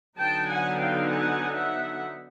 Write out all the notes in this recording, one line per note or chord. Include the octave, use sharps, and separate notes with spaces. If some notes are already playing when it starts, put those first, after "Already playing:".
D3 F#3 B3 D#4 G5 A5
F#5 G#5
F5 G5
F#5 G#5
E5 F#5